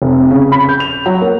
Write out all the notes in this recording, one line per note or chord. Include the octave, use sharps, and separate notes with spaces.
F1
C#3
B5
G6
F7
F#3
A#3